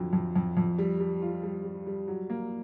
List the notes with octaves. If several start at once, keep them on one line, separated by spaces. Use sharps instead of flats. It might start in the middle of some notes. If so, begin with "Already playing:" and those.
Already playing: F2 D3 F#3
F2
F2
F2
G3
G3
F4
G3
G3
G3
F#3
A#3